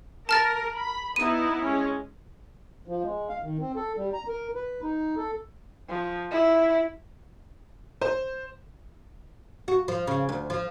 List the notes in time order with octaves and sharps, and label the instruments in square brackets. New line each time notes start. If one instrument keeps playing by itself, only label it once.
[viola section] A#4 [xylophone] A5 F6 A6
[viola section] B5
[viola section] B3 D#4 E4 [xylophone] D#7
[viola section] G#3 C#4
[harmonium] F3
G#3
F5
D#3
C4
A4
G3
A#5
A#4
B4
D#4
A4
[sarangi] F3
E4
[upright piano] C5
[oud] F#4
F3
C#3
D2
F3